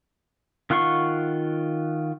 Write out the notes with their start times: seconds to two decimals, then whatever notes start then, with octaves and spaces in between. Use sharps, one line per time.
0.70 D#3 F4 F#5 C6 C#6